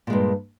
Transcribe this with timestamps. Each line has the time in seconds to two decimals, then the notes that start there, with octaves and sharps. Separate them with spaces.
0.07 A#2
0.10 G#3
0.13 G2